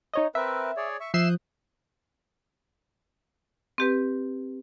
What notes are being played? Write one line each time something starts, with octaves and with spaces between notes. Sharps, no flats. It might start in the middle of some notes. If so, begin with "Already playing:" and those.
D#4 C#5 D#5
C4 A#4 B4 E5
G#4 C#5 D5
E5 C#6
F3 E5 D#6 F#6 G6 C7 E7
C4 G4 B4